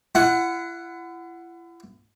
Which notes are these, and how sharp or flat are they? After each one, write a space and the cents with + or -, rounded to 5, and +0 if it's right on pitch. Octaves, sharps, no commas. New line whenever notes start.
E4 +40 F#5 +0